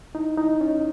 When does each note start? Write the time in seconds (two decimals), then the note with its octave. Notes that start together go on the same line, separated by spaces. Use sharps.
0.15 D#4 E4
0.38 D#4 E4
0.61 C#4 D#5